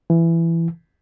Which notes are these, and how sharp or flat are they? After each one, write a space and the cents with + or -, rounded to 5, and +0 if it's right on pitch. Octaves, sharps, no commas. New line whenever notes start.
E3 +15